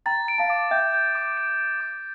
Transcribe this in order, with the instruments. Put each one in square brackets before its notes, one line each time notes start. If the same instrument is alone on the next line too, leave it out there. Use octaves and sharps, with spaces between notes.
[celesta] G5 A#5 [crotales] A6
[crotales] D7
[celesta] F5 A5
[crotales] D6
[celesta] E5 G5 [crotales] G6
[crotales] G6
D6
D7
D7
D6